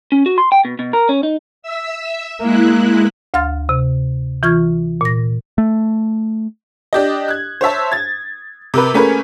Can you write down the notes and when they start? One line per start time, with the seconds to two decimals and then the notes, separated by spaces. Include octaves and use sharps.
0.12 C#4
0.26 F#4
0.38 C6
0.52 G5
0.65 B2
0.79 B2
0.93 A#4
1.09 C#4
1.23 D#4
1.62 E5 E6
2.40 G#3 A#3 E4 F#6
3.34 D2 F5 C6 F6 A6
3.69 C3
4.43 E3 F4 C#6 F6 G#6
5.01 A#2 A#6
5.58 A3
6.93 D4 G4 D#5
7.28 F#6 G#6
7.61 C5 C#5 E5 A5
7.92 G#6 A6
8.74 C3 A#4 B4
8.94 A3 A#3 C#4 G#4 A#4 B4